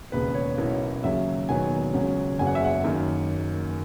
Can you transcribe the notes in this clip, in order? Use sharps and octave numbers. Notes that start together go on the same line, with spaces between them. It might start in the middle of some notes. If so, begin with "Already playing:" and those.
E1 D#2 C#3 B4
C#5
B1 B2 A#3 C#4 E4
D#2 C#3 F#3 E5
E1 D#2 D#3 F#3 B3 G#5
C#2 C#3 F#3 C#4
F#1 E2 C#3 F#3 G#5
F#5
E5
F#5
F#2 D#3 A#3